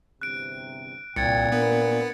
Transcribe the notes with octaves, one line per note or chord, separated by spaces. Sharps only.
G1 E2 C3 F#6 D7
C2 A#2 C4 G5 G#6 A6 C#7
B3 D4 A#4